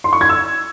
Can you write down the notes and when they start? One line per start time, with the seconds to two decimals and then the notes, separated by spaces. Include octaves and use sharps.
0.04 C6
0.13 C#6
0.21 G#6
0.29 E6